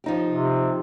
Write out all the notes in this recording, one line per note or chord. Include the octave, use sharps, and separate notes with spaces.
F3 D#4 G4
C3